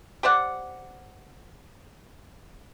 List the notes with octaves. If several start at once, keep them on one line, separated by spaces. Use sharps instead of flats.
G4 C5 D5 F#5